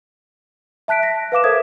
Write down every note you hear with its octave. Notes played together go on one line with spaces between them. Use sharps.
E5 A5 F#6 B6 D7
A#6 B6
B4 F5 D6 E7
A4 A#4 C5 E5 D#6 G#6